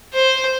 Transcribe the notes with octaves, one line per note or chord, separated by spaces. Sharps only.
C5